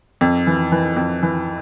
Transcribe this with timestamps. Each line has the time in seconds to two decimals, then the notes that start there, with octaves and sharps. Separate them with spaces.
0.21 F2
0.47 E3
0.72 E3
0.97 F2
1.23 E3